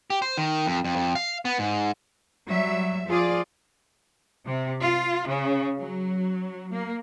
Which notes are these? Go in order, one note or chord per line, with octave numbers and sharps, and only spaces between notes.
G4
C5
D#3
F2
F2
F2
F5
B3
G#2
F#3 G3 E5
F3 F4 G#4 D5
C3
F4
C#3
F#3
A#3